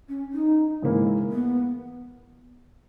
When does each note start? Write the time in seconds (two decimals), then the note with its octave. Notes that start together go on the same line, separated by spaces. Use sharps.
0.09 C#4
0.33 D#4
0.82 G#2 E3 A#3 E4
1.31 B3